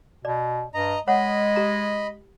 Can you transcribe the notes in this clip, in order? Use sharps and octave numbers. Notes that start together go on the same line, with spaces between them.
B2 D5
G2 D#5 A#5
G#3 C#5 D#5 F#5 B5
G4 A#5